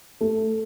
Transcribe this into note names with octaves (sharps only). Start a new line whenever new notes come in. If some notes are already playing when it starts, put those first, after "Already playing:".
A3